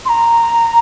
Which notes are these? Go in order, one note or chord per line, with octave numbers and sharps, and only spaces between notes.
C6
A#5